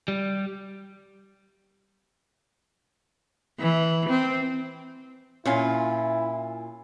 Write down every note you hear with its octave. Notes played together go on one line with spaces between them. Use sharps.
G3
E3
C4
A#2 C#4 E4 F4